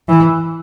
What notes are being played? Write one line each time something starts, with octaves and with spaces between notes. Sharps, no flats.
E3